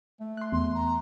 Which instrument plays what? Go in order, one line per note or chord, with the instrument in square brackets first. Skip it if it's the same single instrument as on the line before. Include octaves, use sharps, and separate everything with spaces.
[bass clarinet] A3
[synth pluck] C6 F#6
[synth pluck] E2 [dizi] C6
[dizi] A#5